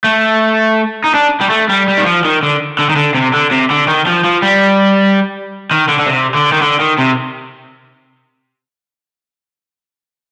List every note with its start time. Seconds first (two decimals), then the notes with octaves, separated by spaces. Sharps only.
0.04 A3
1.04 D#4
1.14 D4
1.41 G3
1.50 A3
1.69 G3
1.88 G3
1.98 D#3
2.06 F3
2.24 D#3
2.43 D3
2.79 D3
2.90 D#3
2.96 D3
3.15 C3
3.34 D3
3.52 C3
3.70 D3
3.88 D#3
4.07 F3
4.24 F3
4.42 G3
5.71 D#3
5.88 D3
5.99 D3
6.07 C3
6.35 D3
6.52 D#3
6.62 D3
6.80 D#3
6.98 C3